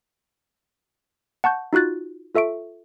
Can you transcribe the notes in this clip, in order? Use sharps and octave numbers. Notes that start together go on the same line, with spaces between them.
F#5 A5 C#6 G6
D#4 F4 F#4 F#6 A6
F4 A4 E5 C#6 D7